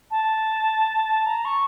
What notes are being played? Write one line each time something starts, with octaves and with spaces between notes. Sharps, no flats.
A5
A#5
C#6